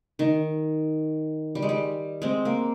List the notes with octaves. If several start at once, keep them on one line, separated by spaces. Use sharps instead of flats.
D#3
G3
G#3
G3
G#3 C4
A#3